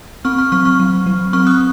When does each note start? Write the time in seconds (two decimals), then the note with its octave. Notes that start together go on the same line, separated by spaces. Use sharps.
0.25 C4 C#6 F6
0.38 C#6 F6
0.52 F#3 C#6 F6
0.65 C#6 F6
0.80 F#3
1.06 F#3
1.33 C4 C#6 F6
1.47 D#6 F#6